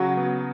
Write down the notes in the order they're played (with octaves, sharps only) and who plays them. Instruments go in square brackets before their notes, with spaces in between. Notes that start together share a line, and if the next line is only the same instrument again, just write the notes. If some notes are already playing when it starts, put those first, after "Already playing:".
Already playing: [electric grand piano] C#3 F#4 [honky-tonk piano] F#3
[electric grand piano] B3